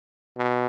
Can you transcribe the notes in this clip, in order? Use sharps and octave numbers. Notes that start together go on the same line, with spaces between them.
B2